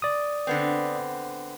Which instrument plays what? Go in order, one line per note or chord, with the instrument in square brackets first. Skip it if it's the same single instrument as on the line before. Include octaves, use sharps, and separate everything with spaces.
[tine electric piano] D5 D#6
[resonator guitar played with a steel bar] D3 B3 C4